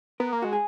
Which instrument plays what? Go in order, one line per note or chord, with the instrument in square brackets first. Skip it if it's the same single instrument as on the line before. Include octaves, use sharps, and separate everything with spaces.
[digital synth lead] B3 [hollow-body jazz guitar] A#4
[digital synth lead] A#3
[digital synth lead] G#3 [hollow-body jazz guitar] F#4
[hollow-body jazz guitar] G#4